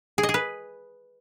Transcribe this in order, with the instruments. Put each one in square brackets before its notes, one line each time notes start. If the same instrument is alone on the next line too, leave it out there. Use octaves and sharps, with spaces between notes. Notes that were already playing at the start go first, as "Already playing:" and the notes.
[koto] G#4
D#5
G#4
B4